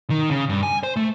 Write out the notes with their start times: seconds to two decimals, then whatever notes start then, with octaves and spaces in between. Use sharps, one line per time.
0.10 D#3
0.31 C#3
0.49 G2
0.63 G#5
0.83 C5
0.96 A3